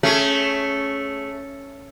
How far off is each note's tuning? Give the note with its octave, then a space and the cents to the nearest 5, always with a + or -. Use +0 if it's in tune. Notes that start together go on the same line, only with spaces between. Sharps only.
A3 +0 C#4 +0 G#4 +25